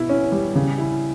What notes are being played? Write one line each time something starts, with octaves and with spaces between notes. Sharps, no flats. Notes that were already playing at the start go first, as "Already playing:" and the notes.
Already playing: B2 E4
C#4
G3
C#3
E4